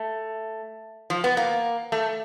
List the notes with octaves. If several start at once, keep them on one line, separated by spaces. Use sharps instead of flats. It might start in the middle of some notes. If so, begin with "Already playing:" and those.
Already playing: A3
F3
B3
A#3
A3